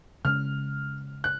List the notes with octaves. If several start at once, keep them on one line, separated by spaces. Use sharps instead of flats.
C#3 G#3 C#4 F6
F#6